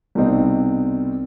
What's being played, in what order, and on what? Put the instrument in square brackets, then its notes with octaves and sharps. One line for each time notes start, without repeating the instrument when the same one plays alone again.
[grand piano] C2 B2 G3 C4 D#4